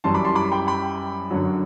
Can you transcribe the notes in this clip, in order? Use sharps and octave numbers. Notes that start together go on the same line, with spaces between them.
F#2 E3 G3 A5 C6
B5 D6
A5 C6
B5 D6
G5 B5
G5 B5
F#2 D3 F#3